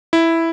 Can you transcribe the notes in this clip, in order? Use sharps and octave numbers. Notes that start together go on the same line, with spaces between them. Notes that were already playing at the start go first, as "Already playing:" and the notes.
E4